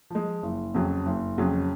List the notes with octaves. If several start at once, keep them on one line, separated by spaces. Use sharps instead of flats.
F3 G#3
F#1
F2 C#3 F#3
F#1
F2 C#3 F#3